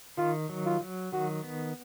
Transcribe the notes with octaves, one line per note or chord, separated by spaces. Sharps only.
D#3 F4
F#3
F4
F#3
D#3 F#4
B3